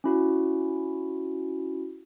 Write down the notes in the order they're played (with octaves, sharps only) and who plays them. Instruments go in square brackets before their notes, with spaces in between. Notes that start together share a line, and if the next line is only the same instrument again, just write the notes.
[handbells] C#4 E4 F#4